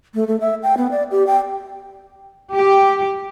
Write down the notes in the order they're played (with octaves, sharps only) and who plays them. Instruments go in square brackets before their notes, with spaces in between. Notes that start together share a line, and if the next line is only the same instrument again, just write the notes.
[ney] A3
A3
E5
G5
B3
D5
G4
G5
[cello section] G4